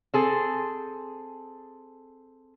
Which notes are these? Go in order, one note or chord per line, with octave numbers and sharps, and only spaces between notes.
C4 G#4 A4